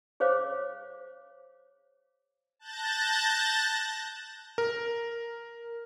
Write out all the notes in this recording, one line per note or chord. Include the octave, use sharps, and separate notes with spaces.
G#4 C5 C#5 F5 D6
A5 F#6 G6 A6 A#6
A#4